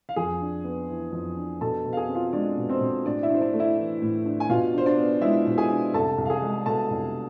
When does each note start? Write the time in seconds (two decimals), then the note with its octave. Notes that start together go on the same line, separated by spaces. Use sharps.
0.09 F5
0.16 F2 G#4 G#5
0.41 D4
0.64 B3
0.89 E3
1.12 F2
1.37 D4
1.61 B2 A4 A5
1.85 B2
1.93 F5
1.97 G#4 G#5
2.09 C4
2.15 F4 F5
2.33 G#3 D4 D5
2.57 B2
2.69 C4 C5
2.81 B2
3.05 A2 D4 D5
3.23 E4 E5
3.30 D4
3.34 C5
3.41 D4 D5
3.53 A3
3.59 E4 E5
3.77 E3
4.02 A2
4.26 D4
4.40 G#5
4.49 B2 F4 F5
4.74 D4
4.78 C5
4.86 D4 D5
4.98 B3
5.21 G#3 E4 E5
5.46 B2
5.58 G#4 G#5
5.70 D4
5.94 C2 A4 A5
6.18 C2
6.25 F5
6.30 G#4 G#5
6.42 G#3
6.66 B2 A4 A5
6.90 C2